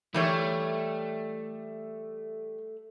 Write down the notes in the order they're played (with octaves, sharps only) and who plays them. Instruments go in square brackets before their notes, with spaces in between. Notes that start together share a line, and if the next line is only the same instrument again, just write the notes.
[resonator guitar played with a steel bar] E3 G3 C#5 [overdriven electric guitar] A3